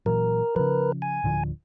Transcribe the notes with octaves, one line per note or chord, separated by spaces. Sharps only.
A#2 E3 F#3 A#4
C#3 F3 A#4 B4
G#5
D1 D3 F3